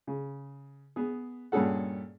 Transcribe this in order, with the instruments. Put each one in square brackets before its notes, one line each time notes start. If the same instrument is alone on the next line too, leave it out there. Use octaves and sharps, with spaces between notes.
[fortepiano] C#3
B3 G#4
G2 A#2 C#4 G#4 A4 F#5